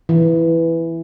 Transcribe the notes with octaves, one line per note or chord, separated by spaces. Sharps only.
E3